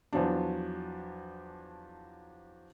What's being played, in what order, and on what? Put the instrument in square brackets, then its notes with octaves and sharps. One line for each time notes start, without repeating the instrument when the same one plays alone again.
[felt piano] E2 F3 F#3 D4